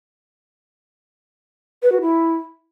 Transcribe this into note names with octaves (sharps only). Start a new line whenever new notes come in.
B4
F#4
E4